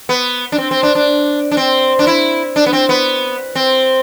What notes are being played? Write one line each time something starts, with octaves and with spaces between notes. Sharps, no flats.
B3
D4
C4
C4
D4
D4
D4
C4
D4
E4
D4
B3
C4
B3
C4